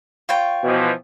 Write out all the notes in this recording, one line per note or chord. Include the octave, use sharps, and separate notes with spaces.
F4 C#5 G5
B2 E3 F3